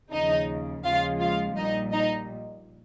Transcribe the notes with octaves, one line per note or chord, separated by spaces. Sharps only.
D#2 C#3 F3 D#4 D#5
D#2 C#3 F3 G#3 F4 F5
F4 F5
A#1 A#2 G3 D#4 D#5
D#4 D#5